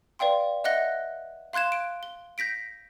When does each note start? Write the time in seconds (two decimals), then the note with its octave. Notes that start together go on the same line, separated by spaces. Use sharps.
0.19 B4 D5 F5 G5 C6
0.64 D#5 E5 F#5 F#6 A#6 G7
1.53 F5 C6 F#6 G#6 E7
1.72 D7
2.03 G7
2.38 G6 A#6 B6 D7